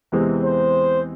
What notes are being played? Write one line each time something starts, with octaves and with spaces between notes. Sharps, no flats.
E2 C3 E3 G#3 C4
C5